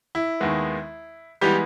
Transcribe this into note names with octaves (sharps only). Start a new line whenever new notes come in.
E4
D#2 D#3 G#3 B3
E3 G3 G#3 B3 G4